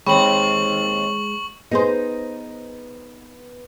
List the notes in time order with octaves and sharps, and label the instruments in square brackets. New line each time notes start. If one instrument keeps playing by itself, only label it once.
[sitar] D#2 C4 [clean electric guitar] G#3 [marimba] C#5 G5 B5 [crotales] C#6 F#7
[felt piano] B3 [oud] D#4 G#4 C5